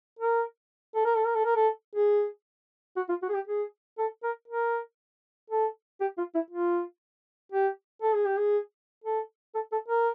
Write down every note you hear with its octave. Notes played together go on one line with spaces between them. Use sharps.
A#4
A4
A#4
A4
A#4
A4
A#4
A4
G#4
F#4
F4
F#4
G#4
G4
G#4
A4
A#4
A#4
A4
G4
F4
E4
F4
G4
A4
G#4
G4
G#4
A4
A4
A4
A#4